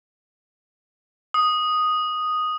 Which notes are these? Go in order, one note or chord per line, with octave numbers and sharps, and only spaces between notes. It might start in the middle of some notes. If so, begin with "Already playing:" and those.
D#6